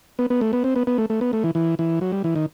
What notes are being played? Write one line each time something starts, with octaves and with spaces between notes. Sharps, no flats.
B3
B3
A3
B3
C4
B3
B3
A3
A3
B3
A3
E3
E3
E3
F#3
G3
E3
D#3